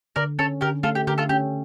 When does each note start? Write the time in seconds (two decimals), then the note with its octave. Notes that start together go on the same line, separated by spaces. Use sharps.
0.16 D3 A#4 D5
0.39 C#4 A4 C#5
0.61 D3 G4 A#4
0.83 A3 F4 A4
0.95 G4
1.07 D3 G4 A#4
1.18 F4 A4
1.29 C#4 G4